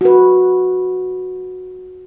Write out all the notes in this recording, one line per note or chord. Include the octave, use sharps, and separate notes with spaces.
F#4 B4